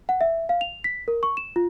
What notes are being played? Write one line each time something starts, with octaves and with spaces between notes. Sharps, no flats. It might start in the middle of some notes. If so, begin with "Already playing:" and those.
F#5
E5
F5
F7
B6
A#4
C#6
E7
F4